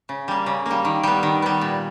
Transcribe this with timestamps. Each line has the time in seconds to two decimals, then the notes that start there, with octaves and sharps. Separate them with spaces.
0.09 C#3
0.28 G3 A#3
0.46 C#3
0.66 G3 A#3
0.85 D#3
1.03 G3 B3
1.23 D#3
1.42 G3 B3
1.61 A#2